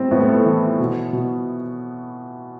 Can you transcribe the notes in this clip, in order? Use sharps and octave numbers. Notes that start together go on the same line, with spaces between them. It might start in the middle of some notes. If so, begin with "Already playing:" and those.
Already playing: A2 G3 C4
A2 B3
A3
B3
E3
B2
B2